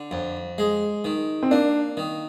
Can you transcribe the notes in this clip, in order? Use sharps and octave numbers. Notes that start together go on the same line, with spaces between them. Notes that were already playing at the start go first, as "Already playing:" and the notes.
Already playing: D3
F2
G#3
D#3
C4
A#3 D4
D#3